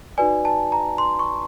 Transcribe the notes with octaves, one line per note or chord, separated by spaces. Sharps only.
D#4 F#4 B4 D5 G#5
A5
A#5
C6
C#6